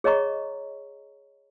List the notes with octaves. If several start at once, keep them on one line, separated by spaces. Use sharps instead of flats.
G#4 C#5 D#5 A#5 C#6